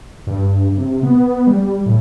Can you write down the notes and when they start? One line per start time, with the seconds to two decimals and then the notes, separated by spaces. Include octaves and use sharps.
0.27 G2
0.78 C3
1.03 B3
1.47 G3
1.86 A2